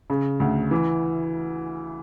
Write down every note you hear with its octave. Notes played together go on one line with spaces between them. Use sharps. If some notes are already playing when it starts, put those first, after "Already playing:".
C#3
D2
E3